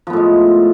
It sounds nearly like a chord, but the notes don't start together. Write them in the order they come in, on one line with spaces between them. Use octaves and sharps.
F3 B3 A2 G#3